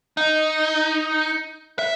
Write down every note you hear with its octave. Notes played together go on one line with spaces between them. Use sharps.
D#4
E5